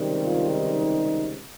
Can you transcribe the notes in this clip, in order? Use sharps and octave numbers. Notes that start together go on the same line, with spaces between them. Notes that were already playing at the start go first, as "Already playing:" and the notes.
Already playing: C#2 C3 D#3 G3 C4
F4
D#4